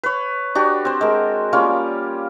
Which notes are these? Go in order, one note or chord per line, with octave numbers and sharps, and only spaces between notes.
B4 C#5
D4 F#4 G4
C4 C5
G#3 A#4
G3 A#3 C#4 F4